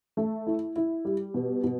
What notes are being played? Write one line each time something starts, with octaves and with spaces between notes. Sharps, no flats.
A3
E4
E4
G3
B2
B2